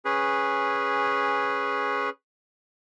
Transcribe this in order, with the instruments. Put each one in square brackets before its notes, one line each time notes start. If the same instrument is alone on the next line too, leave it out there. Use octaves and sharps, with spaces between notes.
[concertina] C#4 G#4 B4